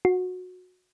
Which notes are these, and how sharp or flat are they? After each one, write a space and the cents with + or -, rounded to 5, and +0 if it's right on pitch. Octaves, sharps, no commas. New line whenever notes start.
F#4 -20